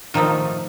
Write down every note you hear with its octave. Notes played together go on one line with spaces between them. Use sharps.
A#2 D#3 F3 A3 D#4